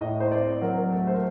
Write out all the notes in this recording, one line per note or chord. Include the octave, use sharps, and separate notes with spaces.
A2 D#5
C5
C4 D5
F#3 A#4
A3 A4
C5
A#4